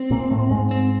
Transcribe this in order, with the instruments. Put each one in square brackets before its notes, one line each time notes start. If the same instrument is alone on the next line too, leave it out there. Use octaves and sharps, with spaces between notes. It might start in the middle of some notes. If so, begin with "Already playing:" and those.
Already playing: [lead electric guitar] C4
[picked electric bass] A#2 A#3
A2 A3
G#2 G#3
[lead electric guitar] C4